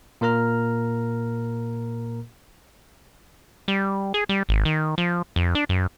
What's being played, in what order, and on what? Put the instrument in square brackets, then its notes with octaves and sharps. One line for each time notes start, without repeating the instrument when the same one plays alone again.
[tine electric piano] A#2 A#3 A#4 A#5 F6
[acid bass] G3
G#4
G3
G#1
D#3
F3
F2
D4
F#2